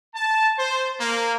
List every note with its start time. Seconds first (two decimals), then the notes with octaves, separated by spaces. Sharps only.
0.14 A5
0.57 C5
1.00 A#3